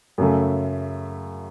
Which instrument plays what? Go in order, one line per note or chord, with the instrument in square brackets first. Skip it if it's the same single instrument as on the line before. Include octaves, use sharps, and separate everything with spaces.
[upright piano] F#2 C#3 A3